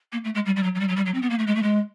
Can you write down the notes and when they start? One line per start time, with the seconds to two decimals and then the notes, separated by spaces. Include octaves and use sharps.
0.12 A#3
0.24 A3
0.35 G#3
0.46 G3
0.56 G3
0.63 F#3
0.75 F#3
0.80 G3
0.88 F#3
0.96 G3
1.06 F#3
1.14 C4
1.22 B3
1.30 A#3
1.39 A3
1.47 G#3
1.55 A3
1.63 G#3